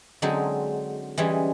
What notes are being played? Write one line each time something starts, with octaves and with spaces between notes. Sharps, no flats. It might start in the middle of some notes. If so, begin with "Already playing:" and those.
D3 F#3 G#3 C4 D#4
E3 G3 G#3 C#4